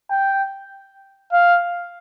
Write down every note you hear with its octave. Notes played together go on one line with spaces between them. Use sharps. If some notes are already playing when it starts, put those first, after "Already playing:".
G5
F5